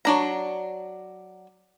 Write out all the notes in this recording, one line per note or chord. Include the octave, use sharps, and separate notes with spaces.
F#3 D4 A#5